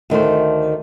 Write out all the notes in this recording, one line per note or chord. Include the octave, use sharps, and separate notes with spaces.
D2 D#3 A3 C5